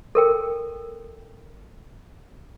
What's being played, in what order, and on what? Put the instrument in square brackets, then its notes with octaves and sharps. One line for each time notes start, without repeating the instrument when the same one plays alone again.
[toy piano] A4 A#4 G5